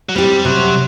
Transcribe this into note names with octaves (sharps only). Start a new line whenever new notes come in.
F#3
G3 C4 G4
C3 F#3